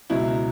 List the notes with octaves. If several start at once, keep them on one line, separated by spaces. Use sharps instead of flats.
C#2 B2 F#3 E4